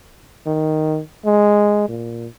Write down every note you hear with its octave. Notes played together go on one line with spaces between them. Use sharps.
D#3
G#3
A#2